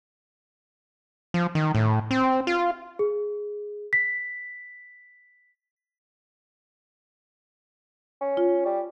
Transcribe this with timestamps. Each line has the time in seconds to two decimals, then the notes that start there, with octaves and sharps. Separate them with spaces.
1.34 F3
1.55 D#3
1.75 A2
2.11 C4
2.47 F4
2.99 G#4
3.93 B6
8.21 C#4
8.37 F4
8.65 G3